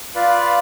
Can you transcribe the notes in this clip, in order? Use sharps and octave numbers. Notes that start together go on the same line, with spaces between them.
F4 B4 D5 F5